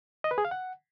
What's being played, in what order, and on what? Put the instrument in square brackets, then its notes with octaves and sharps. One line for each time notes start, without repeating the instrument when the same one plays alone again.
[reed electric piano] D#5
B4
G#4
F5
F#5